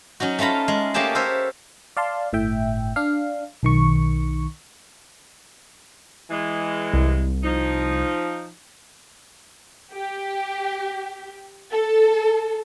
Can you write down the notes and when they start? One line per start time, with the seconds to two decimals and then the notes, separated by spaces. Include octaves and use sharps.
0.20 F#3 C#4 D#4 F#4
0.39 A3 C#4 F4 A#5 B5
0.68 G#3
0.94 A3 A#3 C#4 G4 G#4 A5
1.15 A4 A#4 C5 C#5 E5
1.97 D5 F5 A5 C6
2.33 G1 A2 E5 G5
2.96 D4 F5
3.63 B1 D#3 C#6
6.31 E3 G#3
6.94 C2
7.44 F3 D#4
9.93 G4
11.71 A4